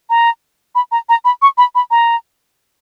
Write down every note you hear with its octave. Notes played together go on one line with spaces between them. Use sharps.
A#5
B5
A#5
A#5
B5
C#6
B5
B5
A#5